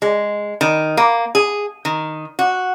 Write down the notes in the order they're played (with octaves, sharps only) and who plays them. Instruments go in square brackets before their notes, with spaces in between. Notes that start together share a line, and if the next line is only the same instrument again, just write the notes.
[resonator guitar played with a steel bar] G#3
D#3
A#3
G#4
D#3
F#4